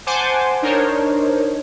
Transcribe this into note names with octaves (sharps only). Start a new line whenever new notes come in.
C5 F#5 G#5 A5 C6 D6
D4 D#4 A#4 C5 C#5